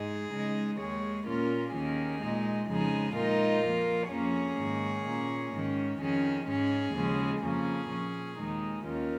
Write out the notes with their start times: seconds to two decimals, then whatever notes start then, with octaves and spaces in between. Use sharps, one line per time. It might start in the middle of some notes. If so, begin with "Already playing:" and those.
Already playing: G#2 G#3 D#4 G#4
0.32 C#3 G#3 D#4
0.79 D#2 D#3 G#3 G#4 C#5
1.27 A#2 A#3 C#4 F4 A#4
1.74 D#2 D#3 A#3 C#4 G#4
2.22 A#2 G#3 D#4
2.68 F2 C#3 F3 G#3 D#4 G#4
3.16 A#2 G#3 D#4 F4 A#4
3.63 F2 F3 A#3
4.10 F2 F3 A#3 C#4 G#4 C#5
4.59 G#2 D#3 A#3
5.06 A#2 A#3 C#4
5.53 G#2 D#3 C#4
6.00 F2 D#3 C#4 G#4
6.47 G#2 G#3 C#4 G#4
6.94 D#2 C#3 F3 G#3 C#4
7.42 F2 C#3 F3 A#3 C#4 G#4
7.90 A#2 F3 C#4
8.37 D#2 D#3 G#3 D#4
8.84 D#2 D#3 C#4 F4 A#4